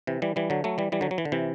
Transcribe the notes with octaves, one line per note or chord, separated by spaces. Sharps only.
C3 E3
E3 G3
E3 G3
D3 F#3
F#3 A3
E3 G3
E3 G3
D3 F#3
F#3
E3
D3
C3 E3